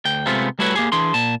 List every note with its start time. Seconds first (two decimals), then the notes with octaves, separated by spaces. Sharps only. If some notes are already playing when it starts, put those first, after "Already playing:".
0.05 D2 G5
0.27 C3 G#3 A3 B3 C4 F4
0.59 G3 A3 E4 F#4 B4 C#5
0.75 A#3 G4 G#4
0.92 E3 D4 G#4 C6
1.14 A#2 A5